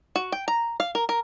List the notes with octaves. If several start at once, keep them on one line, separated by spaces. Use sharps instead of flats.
F#4
G5
A#5
F5
A#4
A#4